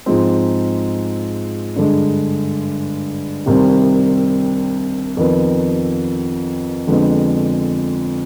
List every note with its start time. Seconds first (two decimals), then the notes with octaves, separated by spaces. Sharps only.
0.06 G#2 F3 G#3 C4
1.76 G2 D3 G#3
3.46 C2 C3 D#3 G3 C4
5.17 F2 D#3 B3
6.87 F2 D3 G#3 B3